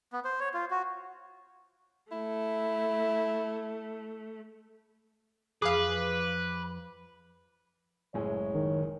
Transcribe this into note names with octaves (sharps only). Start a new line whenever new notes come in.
B3
C5
C#5
F4
F#4
A3 E4
F2 F3 G#4 B4 F5 D6
F#1 A2 G#3 C#5
D#3